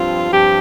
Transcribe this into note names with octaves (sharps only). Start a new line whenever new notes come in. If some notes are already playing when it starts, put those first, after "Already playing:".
Already playing: G2 F3 C4 F4
G2 F3 C4 G4